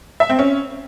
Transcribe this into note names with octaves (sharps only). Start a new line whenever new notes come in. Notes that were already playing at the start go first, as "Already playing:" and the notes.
E5
C4
C#4